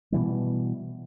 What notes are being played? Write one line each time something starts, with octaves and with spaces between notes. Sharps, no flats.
B2 E3 G3